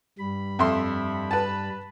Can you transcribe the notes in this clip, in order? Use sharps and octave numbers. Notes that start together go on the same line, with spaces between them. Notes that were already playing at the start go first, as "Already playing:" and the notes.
G2 G3 B5
F2 E5 C6
B4 A5